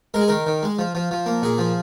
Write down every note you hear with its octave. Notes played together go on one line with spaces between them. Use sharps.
G#3 A#4
G#4
D#3 A#4
D#3
G#3
F3
F3
F3
A#3
A#2 G#4
F3